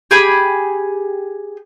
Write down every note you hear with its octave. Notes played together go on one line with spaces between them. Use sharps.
G4 G#4 G#5 B5